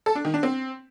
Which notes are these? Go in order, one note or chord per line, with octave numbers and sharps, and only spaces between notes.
A4
D4
D#3
D4
C4